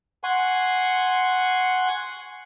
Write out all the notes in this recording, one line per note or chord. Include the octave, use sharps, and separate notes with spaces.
F#5 G#5 C6 C#6